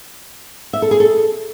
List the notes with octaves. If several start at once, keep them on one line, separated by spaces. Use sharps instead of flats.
E5
A4
G#4
A4